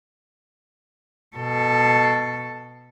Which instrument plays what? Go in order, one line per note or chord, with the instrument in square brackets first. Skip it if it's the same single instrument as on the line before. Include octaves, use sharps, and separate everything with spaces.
[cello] B2 A4